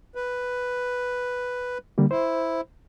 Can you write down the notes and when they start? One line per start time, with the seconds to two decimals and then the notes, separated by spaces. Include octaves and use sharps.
0.15 B4
1.98 D3 G3 A#3
2.11 E4 C5